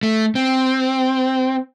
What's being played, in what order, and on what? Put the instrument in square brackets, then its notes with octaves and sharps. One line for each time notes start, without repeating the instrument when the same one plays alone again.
[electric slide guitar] A3
C4